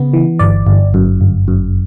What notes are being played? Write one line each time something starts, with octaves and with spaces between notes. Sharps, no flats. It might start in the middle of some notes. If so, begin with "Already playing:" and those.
Already playing: C#3 B3
E3
G1 D5
G1
F#2
G1
F#2